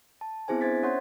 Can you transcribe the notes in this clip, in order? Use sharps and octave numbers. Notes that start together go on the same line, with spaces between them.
A5
B3 C4 E4 G#4 C5 G#5
D4 C5 E5 G#6 A6 B6
C#4 C#5 F#5 C6 G6